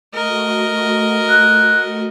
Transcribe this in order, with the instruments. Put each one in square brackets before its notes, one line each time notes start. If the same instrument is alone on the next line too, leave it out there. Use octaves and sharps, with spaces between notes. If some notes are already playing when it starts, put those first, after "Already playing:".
[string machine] A3 F#4 [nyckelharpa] A#4 D#5
[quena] F#6